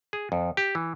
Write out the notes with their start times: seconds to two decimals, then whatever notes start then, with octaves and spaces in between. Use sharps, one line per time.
0.13 G#4
0.32 F2
0.57 G4
0.75 E3